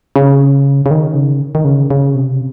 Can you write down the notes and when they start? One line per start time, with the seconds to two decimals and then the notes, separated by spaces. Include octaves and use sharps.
0.16 C#3
0.86 C#3
0.91 D#3
1.15 C#3
1.55 D#3
1.65 C#3
1.91 C#3
2.15 C3